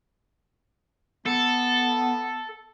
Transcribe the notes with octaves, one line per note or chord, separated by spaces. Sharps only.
B3 A4